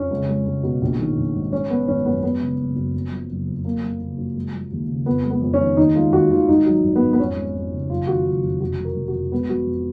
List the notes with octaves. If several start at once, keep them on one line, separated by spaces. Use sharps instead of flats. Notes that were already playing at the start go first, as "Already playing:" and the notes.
Already playing: F2 C#4
C#2
G#3
C#2
B2
A#1
D#3
A#1
G#2
G#3 C#4
F3 B3
G#1 C#4
F#2 B3
G#3 B3
C#3
F#1
F#2
F#1
F3
F#1
F2
F#1 A#3
F3
F#1
F#2
G#3
F3
D#2
C#3
F2 B3
G#3
B3
F2
C#4
D#3
D#2 D#4
G#3 F4
D#2 F#4
D#3 F4
G#1 D#4
F#3
G#1
B3
G#2
B3
F2 C#4
G#3
F2
C#3
F#1 F4
D#3 F#4
F#1 F4
F2
F1 F#4
F3
A#4
F1
F#4
F2
G#3 B3
F3 F#4
F2